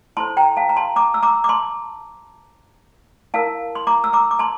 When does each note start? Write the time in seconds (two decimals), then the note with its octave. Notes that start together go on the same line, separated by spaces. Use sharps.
0.17 E4 A4 C5 A5 C6
0.37 G5 A#5
0.56 F5 A5
0.69 A#5
0.76 A5 C6
0.96 A#5 D6
1.14 E6
1.23 A#5 D6
1.44 D6
1.49 A5 C6
3.34 E4 A#4 F5 A5
3.75 C6
3.87 A#5 D6
4.04 E6
4.13 A#5 D6
4.31 D6
4.39 A5 C6